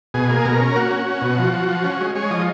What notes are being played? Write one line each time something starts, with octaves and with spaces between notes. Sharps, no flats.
B2 G#4
A#3
B2 A#4
C#4
A#3 F#4
C#4
C#4
B2
F3
F3
F3
C#4
G#3
G#3 C#5
F3 D#5